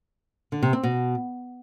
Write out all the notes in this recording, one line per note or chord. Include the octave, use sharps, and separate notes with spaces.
D3
C3
C4
B2